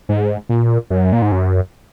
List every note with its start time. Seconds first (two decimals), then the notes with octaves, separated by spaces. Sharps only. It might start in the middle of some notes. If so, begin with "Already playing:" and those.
0.09 G#2
0.49 A#2
0.90 F#2
1.13 A#2
1.22 G#2
1.32 F#2